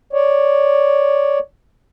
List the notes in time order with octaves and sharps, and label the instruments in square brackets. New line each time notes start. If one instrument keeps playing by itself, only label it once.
[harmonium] C#5 D5